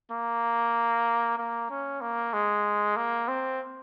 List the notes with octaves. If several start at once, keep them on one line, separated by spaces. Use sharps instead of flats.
A#3
A#3
C#4
A#3
G#3
A#3
C4